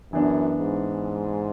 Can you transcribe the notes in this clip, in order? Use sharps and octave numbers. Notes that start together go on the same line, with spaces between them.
F#2 E3 B3 D4
G#2